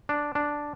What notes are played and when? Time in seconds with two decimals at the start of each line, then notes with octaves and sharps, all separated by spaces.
0.09 D4
0.35 D4